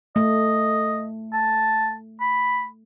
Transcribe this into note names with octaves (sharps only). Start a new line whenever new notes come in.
A3 D#5
A5
B5